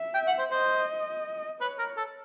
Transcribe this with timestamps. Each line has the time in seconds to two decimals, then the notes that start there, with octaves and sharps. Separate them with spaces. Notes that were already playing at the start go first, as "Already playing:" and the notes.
Already playing: E5
0.14 G5
0.27 F#5
0.39 C5
0.51 C5 D#5
1.61 B4 C#5
1.78 A#4
1.97 A4